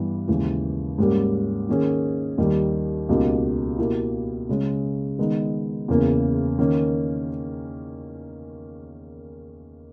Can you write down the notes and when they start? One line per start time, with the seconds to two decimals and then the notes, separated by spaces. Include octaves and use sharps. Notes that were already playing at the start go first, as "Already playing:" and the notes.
Already playing: G2 E3 G3 B3 G4
0.28 D#2 C#3 E3 G#3
0.98 G#2 G3 A#3 C#4 G4
1.69 D#3 A#3 C#4 G#4
2.38 D#2 D#3 G3
3.09 C#2 B2 A#3 D#4 G4
3.78 B2 A#3 E4 G4
4.49 C#3 G#3 C#4
5.19 D#3 G#3 B3 D#4
5.88 E2 C#3 E3 A#3
6.59 D#3 A#3 C#4